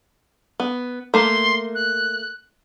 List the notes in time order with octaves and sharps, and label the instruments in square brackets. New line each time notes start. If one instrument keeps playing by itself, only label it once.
[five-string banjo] B3
[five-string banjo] A3 A#3 [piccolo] C6
[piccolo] F#6